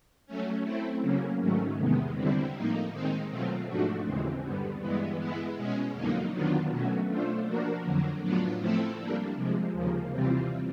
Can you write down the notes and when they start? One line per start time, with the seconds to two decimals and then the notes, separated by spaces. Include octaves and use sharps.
0.27 F#3 A3 C#4
0.64 A3 C4 E4
1.02 C#3 F#3 A#3 C#4
1.40 G#2 D#3 F#3 A3 C#4
1.78 E2 C3 D#3 G#3 B3
2.16 D3 G3 C4 E4
2.54 A2 F3 A#3 D#4
2.92 D#3 G#3 C4 D#4
3.29 B2 F#3 A3 C4 F4
3.67 G#2 F3 A3 D4 F#4
4.05 D#2 C#3 E3 G#3 C4
4.42 G2 D3 G3 B3
4.81 G2 E3 G#3 B3 E4
5.18 G#3 B3 E4
5.57 B2 G#3 C#4
5.94 F2 D3 F#3 A#3 D#4
6.32 D#3 F#3 B3 D4 F4
6.70 B2 F#3 A3 C#4 F#4
7.08 A3 D4 F4 A4 C5
7.46 F3 A#3 D4 F#4 A#4
7.84 F2 D3 F#3
8.22 A2 F#3 B3 D4 F4
8.59 F3 A3 C4 E4 A4
8.97 G3 A#3 D4
9.35 C3 F3 G#3
9.73 D#2 C#3 F3 A#3
10.11 C3 E3 G3 C4 F4